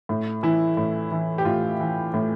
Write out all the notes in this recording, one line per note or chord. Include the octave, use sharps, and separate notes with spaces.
A2
E3 E4
A2
E3
G4
A2 F4
E3
A2